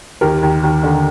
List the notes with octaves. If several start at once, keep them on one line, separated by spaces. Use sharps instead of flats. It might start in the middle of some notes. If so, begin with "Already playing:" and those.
D#2 G4 A#4
D#2
D#2
D3